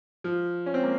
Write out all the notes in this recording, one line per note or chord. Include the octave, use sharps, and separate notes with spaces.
F3
C#4
C4
A#3